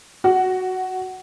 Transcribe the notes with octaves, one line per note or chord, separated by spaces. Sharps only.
F#4